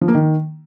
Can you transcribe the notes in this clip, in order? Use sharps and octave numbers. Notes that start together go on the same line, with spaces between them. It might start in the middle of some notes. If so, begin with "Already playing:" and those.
F3
A#3
D#3